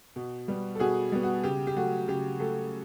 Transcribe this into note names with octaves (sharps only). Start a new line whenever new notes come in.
B2
G3 B3
A4
B2 F#4 G#4
G3 B3
F#4
C#3 G4
G4
F#3 A3 F#4
C#3 G4
F#3 A3 G4 A4